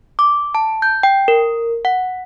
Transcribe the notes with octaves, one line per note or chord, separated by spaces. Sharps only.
D6
A5
G6
G5
A#4
F#5